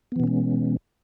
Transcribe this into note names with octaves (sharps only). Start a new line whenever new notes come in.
B2 E3 G#3 B3 C#4